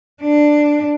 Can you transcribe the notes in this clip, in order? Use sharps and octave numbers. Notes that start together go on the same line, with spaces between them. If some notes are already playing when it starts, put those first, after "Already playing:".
D4